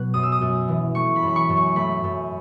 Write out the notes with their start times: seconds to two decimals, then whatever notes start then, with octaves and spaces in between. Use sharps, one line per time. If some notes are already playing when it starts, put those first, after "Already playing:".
Already playing: B2 F#3 B3 F#6
0.14 F#2 D#6
0.23 E6
0.32 D#6
0.41 F#2
0.68 E3
0.95 A3 C#6
1.16 B5
1.22 F#2
1.28 B5
1.36 C#6
1.49 F#2
1.57 C#6
1.76 A3 B5
2.04 F#2